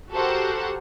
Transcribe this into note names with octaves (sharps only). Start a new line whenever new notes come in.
F#4 G4 A4 A#4 C5 F#5